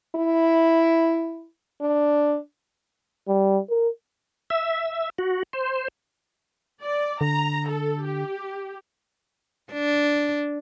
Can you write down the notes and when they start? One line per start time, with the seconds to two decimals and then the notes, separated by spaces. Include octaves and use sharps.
0.16 E4
1.81 D4
3.28 G3
3.70 A#4
4.50 E5
5.18 F#4
5.53 C5
6.82 D5
7.21 D3 A#5
7.68 A4
8.04 G4
9.73 D4